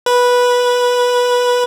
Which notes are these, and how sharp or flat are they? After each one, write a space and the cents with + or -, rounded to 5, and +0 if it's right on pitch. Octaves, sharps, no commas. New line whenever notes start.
B4 -10